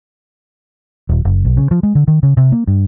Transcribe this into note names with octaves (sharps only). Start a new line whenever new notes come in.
D#1
F#1
B1
C#3
F3
G#3
D3
D#3
C#3
C3
A#3
G2